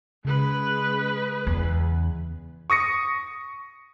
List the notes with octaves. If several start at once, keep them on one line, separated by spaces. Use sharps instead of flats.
C#3 G#3 B4
E2
C#6 D#6 A#6 C#7